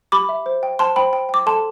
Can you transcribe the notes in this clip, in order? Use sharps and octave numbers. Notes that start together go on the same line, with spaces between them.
G4 B5 D6
E5
C5
G5
C5 A5 C6
C5 G5 B5
G5
G5 D6
A4 A5 C6